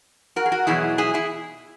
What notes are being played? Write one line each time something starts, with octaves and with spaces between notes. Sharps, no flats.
F#4 A#4
G#4
F#4 A#4
E2 B2 F#3 E4 G#4
E4 G#4
E4 G#4